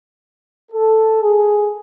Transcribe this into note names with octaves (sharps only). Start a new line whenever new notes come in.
A4
G#4